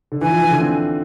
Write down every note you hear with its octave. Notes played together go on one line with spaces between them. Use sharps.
D3
E3 G#5
F3
E3
D3
C4